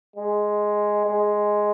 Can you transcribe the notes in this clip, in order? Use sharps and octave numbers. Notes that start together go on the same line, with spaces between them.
G#3
G#3